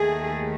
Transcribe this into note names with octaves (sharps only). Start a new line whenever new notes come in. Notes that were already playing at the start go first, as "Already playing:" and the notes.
Already playing: D#2 D#3 A3 G#4